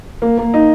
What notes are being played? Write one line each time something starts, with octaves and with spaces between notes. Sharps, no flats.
A#3
A#3
D#4